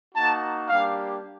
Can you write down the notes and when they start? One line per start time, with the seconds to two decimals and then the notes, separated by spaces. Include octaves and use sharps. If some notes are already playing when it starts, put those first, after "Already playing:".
0.15 A#3 D#4 F#4 A5
0.68 G3 A#3 D4 G4 F5